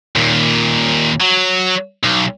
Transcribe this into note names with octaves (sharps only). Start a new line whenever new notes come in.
D#2 A#2
F#3
B1